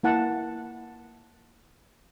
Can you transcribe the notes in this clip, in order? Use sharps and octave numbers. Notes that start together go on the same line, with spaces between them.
A#3 E4 F#5 A5